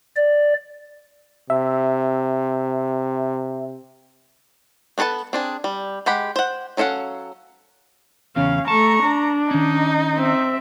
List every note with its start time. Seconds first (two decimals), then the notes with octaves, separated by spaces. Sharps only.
0.16 D5
1.50 C3 E5
4.98 B3 D4 A4 B4 A5
5.33 C4 D4 G#4
5.64 G3
6.06 G#3 G4 F#5 B5
6.36 C5 F#5
6.77 F#3 C#4 A4 F5 F#5
8.36 E2 C#3 C#4 F5
8.68 A3 A5 A#5 C#6
9.03 D4
9.51 D#3 C#4 D#4
10.15 C4 E5